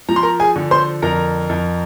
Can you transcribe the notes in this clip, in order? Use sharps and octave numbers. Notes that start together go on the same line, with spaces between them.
F3 A#5
C6
A#4 A#5
G#4 G#5
D3
C5 C6
F2 A#4 A#5
F2